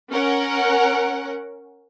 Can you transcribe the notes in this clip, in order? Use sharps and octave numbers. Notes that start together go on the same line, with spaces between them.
C#4 A#4 F#5